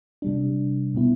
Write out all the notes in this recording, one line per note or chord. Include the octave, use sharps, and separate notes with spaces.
C3 G3 D4
B2 B3 E4